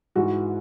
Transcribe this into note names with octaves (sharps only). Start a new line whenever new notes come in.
G#2 E3 F#4